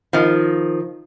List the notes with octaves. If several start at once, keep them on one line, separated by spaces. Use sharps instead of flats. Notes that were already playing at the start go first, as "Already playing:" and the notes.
D#3 F3